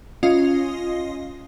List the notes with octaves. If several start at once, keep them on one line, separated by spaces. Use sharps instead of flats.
C#4 F4 D#5 F5 D#6